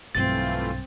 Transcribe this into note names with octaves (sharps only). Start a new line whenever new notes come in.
B1 G2 E3 A3 C4 F4 A6